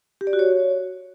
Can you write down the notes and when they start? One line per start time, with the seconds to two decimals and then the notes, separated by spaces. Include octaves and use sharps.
0.21 G4
0.27 D5
0.33 F#4
0.39 C#5